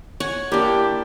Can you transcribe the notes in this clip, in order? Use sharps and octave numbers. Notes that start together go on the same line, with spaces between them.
C#5 F#5 G#5
A#3 D4 E4 G4